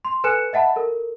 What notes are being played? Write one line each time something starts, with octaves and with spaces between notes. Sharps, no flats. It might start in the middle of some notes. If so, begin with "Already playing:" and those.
C6
A4 B4 G#5 F#6 C#7 E7
D#5 E5 F#5 A5 B5
A4 A#4